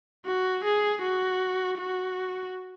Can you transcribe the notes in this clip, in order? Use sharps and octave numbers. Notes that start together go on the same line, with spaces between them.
F#4
G#4
F#4
F#4